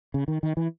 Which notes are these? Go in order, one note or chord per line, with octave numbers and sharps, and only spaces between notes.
C#3
D#3
D#3
E3